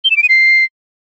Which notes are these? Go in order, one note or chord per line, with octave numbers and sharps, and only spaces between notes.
G7
E7
D7
D#7
C7